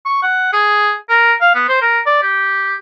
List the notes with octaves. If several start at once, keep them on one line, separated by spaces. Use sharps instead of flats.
C#6
F#5
G#4
A#4
F5
B3
C5
A#4
D5
G4